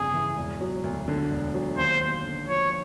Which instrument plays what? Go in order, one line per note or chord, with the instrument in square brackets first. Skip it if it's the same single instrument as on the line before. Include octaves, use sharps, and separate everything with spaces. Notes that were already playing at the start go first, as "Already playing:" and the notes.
Already playing: [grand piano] G1 F2 C#3 [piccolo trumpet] G#4
[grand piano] E3
E1
F#3
D2
D3
E1
F#3
[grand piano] D#2 [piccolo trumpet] C5
[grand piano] D#2
D3
[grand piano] F3 [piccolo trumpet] C#5